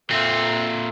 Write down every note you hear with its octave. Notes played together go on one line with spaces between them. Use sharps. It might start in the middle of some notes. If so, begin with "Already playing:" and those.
A#2 C4 A4 E5